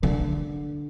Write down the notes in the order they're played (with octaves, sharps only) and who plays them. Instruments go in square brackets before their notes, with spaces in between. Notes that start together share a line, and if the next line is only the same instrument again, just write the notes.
[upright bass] D3